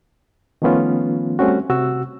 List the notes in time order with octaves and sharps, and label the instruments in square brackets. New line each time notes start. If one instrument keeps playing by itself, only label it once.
[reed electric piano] D#3 F3 A3 B3 C#4 F4
G3 A3 C4 C#4 F#4
C3 F#4 E6